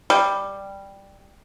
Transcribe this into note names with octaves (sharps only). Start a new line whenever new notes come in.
G3